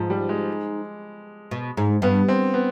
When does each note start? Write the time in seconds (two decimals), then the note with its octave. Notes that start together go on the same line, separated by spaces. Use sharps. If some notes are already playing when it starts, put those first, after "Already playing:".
Already playing: G#2 F3
0.10 G3
0.29 G#3
1.51 B2
1.77 G#2
2.02 G2 B3
2.28 C4
2.54 B3